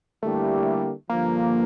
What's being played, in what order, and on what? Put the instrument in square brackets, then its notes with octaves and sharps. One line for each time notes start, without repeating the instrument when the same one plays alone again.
[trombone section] D3 G3 A#3 E4 G4 [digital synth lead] A3
[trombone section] G2 D3 F3 [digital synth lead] A#3